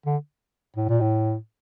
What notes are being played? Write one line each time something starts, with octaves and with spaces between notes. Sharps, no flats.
D3
A2
A#2
A2